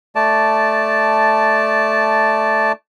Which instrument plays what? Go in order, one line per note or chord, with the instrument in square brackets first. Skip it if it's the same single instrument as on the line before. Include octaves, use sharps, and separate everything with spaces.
[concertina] A3 D5 A5